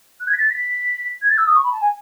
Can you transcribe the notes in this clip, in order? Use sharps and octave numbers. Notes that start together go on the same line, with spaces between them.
F#6
G#6
B6
A6
B6
G#6
A6
E6
D#6
C#6
B5
A5
G#5